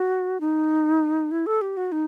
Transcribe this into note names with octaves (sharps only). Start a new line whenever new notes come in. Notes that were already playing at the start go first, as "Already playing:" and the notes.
Already playing: F#4
D#4
E4
A4
G4
F#4
D#4